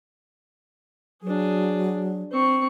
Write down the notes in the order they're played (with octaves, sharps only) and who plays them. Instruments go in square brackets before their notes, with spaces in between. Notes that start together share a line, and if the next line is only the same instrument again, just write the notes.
[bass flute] F#3 [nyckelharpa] D4 G#4
[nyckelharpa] C4 C#6